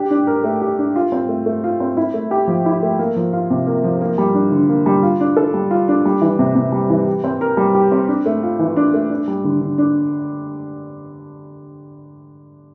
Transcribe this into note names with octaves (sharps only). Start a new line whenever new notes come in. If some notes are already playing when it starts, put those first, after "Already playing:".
Already playing: D4 G4
D4
A#4
A3
G4
D4
F4
C4
A3
A3
F4
C4
E4
A3
G4
F3
E4
A3
A#3
F3
F4
C3
A#3
F3
A#3
G3
D4
D3
A#3
G3
F4
D4
A4
G3
F4
D4
G3
E3
C3
C3
G3
E3
G4
C4
A#4
G3
G4
C4
D4
A3
F4
E3
D4
A3
D4
G3
D3
D3
D4